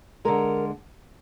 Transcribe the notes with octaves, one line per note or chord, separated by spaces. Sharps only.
D3 G#3 A#4